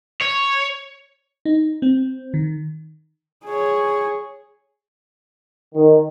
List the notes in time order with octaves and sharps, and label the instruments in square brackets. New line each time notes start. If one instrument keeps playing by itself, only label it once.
[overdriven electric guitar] C#5
[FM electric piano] D#4
C4
D#3
[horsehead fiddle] G#4 C#5
[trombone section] D#3